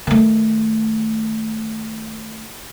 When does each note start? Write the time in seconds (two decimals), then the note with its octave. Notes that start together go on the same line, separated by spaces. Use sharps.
0.07 D#3 A3